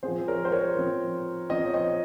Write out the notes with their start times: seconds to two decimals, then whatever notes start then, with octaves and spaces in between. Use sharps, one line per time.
0.03 C4 G#4 C5
0.08 F3
0.28 A#4 C#5
0.45 C5
0.52 A#4 C#5
0.77 F3 C4
1.49 F3 C4 C5 D#5
1.66 C#5
1.74 C5 D#5